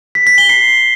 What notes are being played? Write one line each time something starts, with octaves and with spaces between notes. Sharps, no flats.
B6
B6
G7
C7